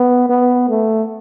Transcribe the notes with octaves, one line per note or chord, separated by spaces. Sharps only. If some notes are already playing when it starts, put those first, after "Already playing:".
Already playing: B3
B3
A3